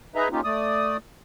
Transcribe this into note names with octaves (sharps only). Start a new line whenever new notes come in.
D#4 G#4 B4 D#5 E5 A#5
A#3 C#4 D#4 F4 G4
A3 D5 D#6